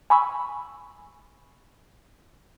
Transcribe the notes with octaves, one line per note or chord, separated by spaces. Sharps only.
G#5 B5 C#6 E6